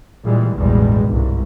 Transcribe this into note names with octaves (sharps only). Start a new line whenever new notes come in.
A#2 E3 G3 G#3
A1 E2 G2 B2 G3 G#3
G1 C2 G#2